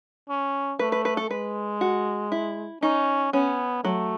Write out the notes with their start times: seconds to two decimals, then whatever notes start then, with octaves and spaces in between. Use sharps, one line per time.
0.29 C#4
0.79 A3 B4
0.92 B4
1.05 B4
1.17 A4
1.30 G#3 B4
1.81 F#4
2.32 E4
2.83 C#4 D#4
3.33 B3 C#4
3.84 F#3 A3